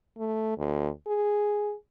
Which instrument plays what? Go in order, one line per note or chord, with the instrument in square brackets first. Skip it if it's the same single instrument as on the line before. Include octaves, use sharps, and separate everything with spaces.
[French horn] A3
D2
G#4